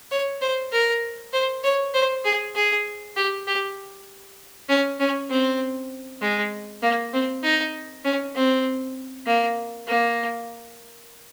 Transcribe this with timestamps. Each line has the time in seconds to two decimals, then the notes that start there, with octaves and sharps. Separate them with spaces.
0.11 C#5
0.41 C5
0.72 A#4
1.33 C5
1.63 C#5
1.94 C5
2.25 G#4
2.55 G#4
3.16 G4
3.47 G4
4.69 C#4
4.99 C#4
5.30 C4
6.22 G#3
6.82 A#3
7.13 C4
7.43 D#4
8.05 C#4
8.35 C4
9.26 A#3
9.88 A#3